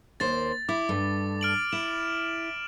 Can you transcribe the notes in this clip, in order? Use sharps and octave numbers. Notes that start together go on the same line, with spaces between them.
D#2 A#3 C5 A6
E4 D6
G2 A3
F6 D7 F#7
E4 E7